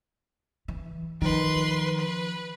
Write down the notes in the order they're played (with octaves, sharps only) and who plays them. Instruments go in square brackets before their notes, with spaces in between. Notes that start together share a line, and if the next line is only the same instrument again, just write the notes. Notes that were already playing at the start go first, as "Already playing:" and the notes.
[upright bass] E3
[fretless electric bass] D#3 [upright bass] F3 [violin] B4 C6
[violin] B4